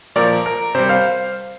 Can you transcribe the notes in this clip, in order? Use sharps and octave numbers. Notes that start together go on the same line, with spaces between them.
A#2 F3 A#4 D5
A#4
C3 G3 C5
C5 F5